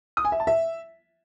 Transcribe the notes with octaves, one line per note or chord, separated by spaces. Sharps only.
D#6
G#5
E5
A5
E5